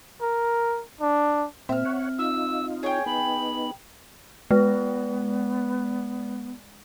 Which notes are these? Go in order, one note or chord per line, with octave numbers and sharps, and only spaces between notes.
A#4
D4
A#2 C4 E5 F6
C#5 F#5
D#4 F4 E6
G#4 C#5 G5
B3 D#4 B5
G#3 B3 B4